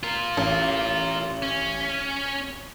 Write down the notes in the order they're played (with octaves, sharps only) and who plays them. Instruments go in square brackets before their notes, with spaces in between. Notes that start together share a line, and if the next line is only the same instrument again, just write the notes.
[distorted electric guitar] F4 A#4
[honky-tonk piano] A1
[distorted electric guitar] C#4